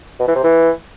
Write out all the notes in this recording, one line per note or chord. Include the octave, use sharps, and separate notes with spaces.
B2
E3
C3
E3